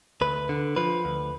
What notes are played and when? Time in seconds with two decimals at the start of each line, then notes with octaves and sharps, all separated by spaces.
0.21 D2 B4
0.49 D3
0.76 F3 B4
1.05 D2